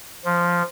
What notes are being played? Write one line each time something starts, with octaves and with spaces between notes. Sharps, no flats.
F3